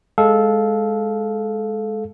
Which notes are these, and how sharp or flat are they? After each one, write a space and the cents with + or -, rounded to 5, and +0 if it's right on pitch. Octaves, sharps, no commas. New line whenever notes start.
G#3 +0 A4 -15 F5 +0